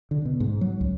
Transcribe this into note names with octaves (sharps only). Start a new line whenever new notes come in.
D3
B2
G#2
F#3
C#2